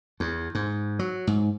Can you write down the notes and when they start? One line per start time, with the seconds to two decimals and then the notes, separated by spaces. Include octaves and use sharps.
0.20 E2
0.55 G#2
0.99 F#3
1.27 G#2